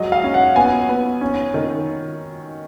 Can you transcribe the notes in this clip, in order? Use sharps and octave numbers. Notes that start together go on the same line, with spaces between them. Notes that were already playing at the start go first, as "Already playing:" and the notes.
Already playing: F#3 G#3 D#5
F5
C#4
F#5
B3 G#5
B3
C#4
D#3